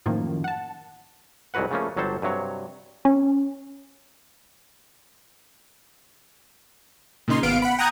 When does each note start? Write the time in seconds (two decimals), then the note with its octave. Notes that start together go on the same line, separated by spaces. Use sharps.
0.06 F#2 A2 D#3 F3 A#3
0.44 F#5 A5
1.54 C2 G#2 F#3 F#4 B4 F#5
1.71 C#3 F3 A3 A#3 C#4
1.97 G1 F#3 G3 A4 C5 A5
2.22 G2 C3 F#3 C#5
3.05 C#4
7.28 A#2 C#3 D#4 C6
7.43 G#1 B3 F5 D7
7.62 F#5 B5
7.78 F#5 G5 A#5 D#6 F#6 G#6